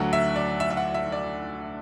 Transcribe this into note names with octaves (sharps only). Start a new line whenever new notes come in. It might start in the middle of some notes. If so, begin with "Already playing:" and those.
Already playing: D2 D3 F#3 F#5
E5
D5
E5
E5
F#5
E5
D5